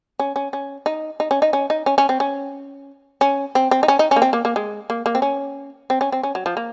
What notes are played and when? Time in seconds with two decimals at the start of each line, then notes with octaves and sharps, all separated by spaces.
0.20 C#4
0.36 C#4
0.53 C#4
0.86 D#4
1.20 D#4
1.31 C#4
1.42 D#4
1.53 C#4
1.70 D#4
1.86 C#4
1.98 C#4
2.09 C4
2.20 C#4
3.21 C#4
3.55 C4
3.71 C4
3.83 D#4
3.88 C#4
3.99 D#4
4.11 C#4
4.16 A#3
4.22 C4
4.33 A#3
4.45 A#3
4.56 G#3
4.90 A#3
5.06 A#3
5.15 C4
5.22 C#4
5.90 C4
6.01 C#4
6.12 C4
6.23 C#4
6.35 F#3
6.46 F3
6.57 A#3